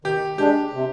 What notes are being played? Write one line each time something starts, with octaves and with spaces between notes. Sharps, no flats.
D#3 G4
G#3 D4 G4
C3